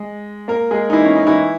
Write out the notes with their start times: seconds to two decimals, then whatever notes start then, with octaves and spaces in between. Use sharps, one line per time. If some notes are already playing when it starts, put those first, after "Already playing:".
Already playing: G#3
0.48 A#3 A#4
0.71 G#3 G#4
0.90 D#4
0.93 E3 E4
1.05 C#4
1.16 D#4
1.27 E3 E4